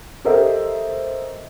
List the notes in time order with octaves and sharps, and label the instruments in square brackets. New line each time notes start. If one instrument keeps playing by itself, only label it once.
[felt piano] G4 A4 A#4 C5 D#5 E5